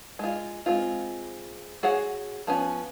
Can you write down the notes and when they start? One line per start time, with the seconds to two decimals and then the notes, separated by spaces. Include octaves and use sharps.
0.19 G#3 F4
0.66 G#3 C4 F4
1.83 F#4 G#4 C#5 F#5
2.47 F3 B3 C#4